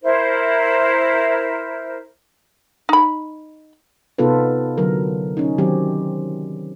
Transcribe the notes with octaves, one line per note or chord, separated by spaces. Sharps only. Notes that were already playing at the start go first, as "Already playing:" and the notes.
E4 A#4 C5
D#4 B5
C3 B3 D#4 F4 A4 B4
D3 F#3 A#4
C#4 D#4
D#3 F#3 C4 G4